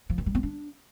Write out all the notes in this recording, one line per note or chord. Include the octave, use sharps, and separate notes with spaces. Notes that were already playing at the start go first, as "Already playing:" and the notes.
F3
D#3
G3
B3
D4